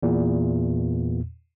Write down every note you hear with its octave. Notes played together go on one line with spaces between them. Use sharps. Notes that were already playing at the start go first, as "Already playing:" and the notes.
E2 A#2